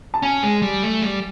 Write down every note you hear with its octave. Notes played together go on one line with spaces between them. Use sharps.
A5
C#4 G#5
G#3
G3
A3
G3